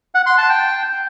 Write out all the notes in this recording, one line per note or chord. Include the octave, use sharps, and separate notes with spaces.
F#5
C6
A5
G5